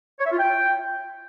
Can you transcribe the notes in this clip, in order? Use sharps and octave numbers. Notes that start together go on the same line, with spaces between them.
C#5
E5
F4
G5